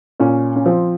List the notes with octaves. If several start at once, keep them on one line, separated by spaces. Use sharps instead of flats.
A#2 C#4
C#4
F3 C4